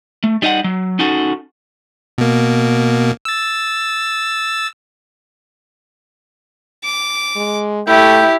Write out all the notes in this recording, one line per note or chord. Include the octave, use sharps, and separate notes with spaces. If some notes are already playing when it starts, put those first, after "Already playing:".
A3
G3 D#4 D#5 F5 F#5
F#3
C#4 D#4 F#4 A4
B2 A#3
E6 A6
D6
G#3
A3 E4 G4 G5